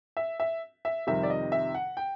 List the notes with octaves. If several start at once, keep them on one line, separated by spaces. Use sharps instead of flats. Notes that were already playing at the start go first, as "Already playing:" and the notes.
E5
E5
E5
F2 C3 D#3 G3 E5
D5
D#5
E5
F#5
G5